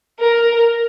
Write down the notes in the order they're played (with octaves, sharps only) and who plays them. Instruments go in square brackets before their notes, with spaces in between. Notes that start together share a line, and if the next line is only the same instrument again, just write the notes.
[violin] A#4